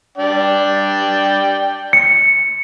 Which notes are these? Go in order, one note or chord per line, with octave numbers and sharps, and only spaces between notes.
D4 D5 G5
C#7